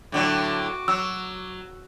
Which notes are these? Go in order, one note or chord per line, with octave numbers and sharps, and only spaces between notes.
A2 D3 F#3 F#4 D6
F#3 E6